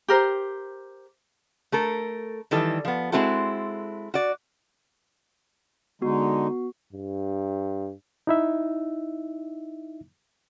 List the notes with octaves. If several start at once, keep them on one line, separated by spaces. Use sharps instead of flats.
G4 A#4 C5
A3 A4 A#4
D#3 E3 G3 A4
F3 B3
G#3 C4 E4 F#4 A4
F#4 D5
D3 G#3 B3 D#4 F#4
G2
D#4 E4 E5